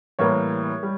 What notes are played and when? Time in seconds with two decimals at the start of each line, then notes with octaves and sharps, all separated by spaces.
0.19 A2 E3 G3 A#3 C#5
0.83 G3